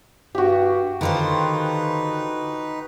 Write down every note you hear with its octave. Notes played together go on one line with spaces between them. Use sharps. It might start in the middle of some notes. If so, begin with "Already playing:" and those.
G2 F#4 G4
D3 D#3 D#4 F4 B4 C5